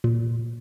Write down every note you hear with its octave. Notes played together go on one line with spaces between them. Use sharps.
A#2